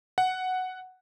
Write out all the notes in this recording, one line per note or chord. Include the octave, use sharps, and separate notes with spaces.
F#5